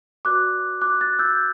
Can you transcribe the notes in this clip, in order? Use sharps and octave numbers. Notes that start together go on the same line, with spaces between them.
F#4 B4 D5 D6 F#6
D6 F#6
F#6 A6
E6 G6